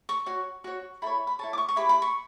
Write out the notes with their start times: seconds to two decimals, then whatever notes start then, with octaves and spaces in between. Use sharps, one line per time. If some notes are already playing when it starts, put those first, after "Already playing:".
0.09 C#6
0.26 F#4 C#5
0.64 F#4 C#5
1.02 E4 A4 C#5 B5
1.27 B5
1.39 E4 A4 C#5 A5
1.53 D6
1.58 C#6
1.69 C#6
1.76 E4 G4 B4 B5
1.89 B5
2.02 C#6